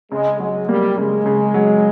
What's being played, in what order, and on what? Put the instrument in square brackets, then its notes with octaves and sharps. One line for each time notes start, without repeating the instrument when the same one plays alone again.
[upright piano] C#3 [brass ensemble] G#3
[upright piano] F#3 [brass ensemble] G#3
[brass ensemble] G3 [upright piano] A#3
[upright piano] C#3 [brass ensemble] G#3
[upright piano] C#3
F#3